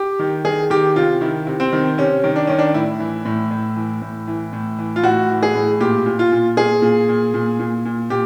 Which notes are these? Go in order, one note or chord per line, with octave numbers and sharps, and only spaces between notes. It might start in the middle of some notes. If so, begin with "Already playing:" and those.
Already playing: G4
D#3
D#3 G#4
D#3 G4
C3 F4
D#3 E4
C3
C4
D#3
C3 C#4
D#3
D4
D#3 C#4
D4
A2 E4
E3
A2
A2
E3
A2
E3
A2
E3
F4
A2 F#4
E3
G#4
A2
A#2 G4
A#2
F4
A#2
A#2 G#4
A#2
A#2
A#2
A#2
A#2
A#2 G4